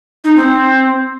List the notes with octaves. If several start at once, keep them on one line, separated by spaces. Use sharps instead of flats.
D#4
C4